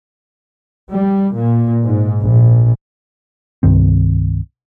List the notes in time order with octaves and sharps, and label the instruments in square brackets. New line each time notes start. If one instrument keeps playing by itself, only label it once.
[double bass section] G3
A#2
G#2
A#1
[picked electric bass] C2 G2 D#3 C4